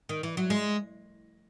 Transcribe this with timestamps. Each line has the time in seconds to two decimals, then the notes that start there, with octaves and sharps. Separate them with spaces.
0.09 D#3
0.23 E3
0.37 F#3
0.50 G#3